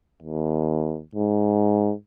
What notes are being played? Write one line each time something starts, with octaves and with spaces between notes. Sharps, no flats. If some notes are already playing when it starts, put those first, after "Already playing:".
D#2
G#2